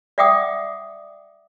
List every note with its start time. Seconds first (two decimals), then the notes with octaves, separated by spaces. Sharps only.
0.18 D5 E5 F#5 G5 D6 D#6